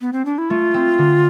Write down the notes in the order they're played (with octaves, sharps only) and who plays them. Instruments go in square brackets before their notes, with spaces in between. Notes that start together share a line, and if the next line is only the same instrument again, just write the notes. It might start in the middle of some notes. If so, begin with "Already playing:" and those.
[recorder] B3
C4
D4
E4
[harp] A3 [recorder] F4
[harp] C4
D3